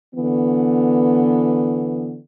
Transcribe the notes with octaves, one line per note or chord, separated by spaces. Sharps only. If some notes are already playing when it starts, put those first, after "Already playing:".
D3 E3 B3